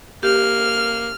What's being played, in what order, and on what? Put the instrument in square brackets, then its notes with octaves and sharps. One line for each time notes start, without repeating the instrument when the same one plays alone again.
[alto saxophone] A#3 [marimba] G4 [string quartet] F6